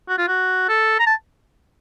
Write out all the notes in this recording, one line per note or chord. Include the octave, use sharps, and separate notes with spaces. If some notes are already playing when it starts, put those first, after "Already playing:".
F#4
F4
F#4
A4
A#5
A5